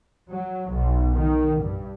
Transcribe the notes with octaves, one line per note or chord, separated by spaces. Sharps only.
F#3
B1
D#3
G2